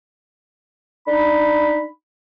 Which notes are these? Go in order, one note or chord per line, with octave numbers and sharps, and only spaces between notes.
D4 D#4 B5